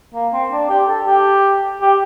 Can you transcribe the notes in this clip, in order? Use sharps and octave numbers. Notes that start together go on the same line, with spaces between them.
A#3
C4
D4
G4
A4
G4
G4